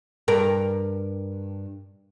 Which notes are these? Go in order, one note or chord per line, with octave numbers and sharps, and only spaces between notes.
G2 A#4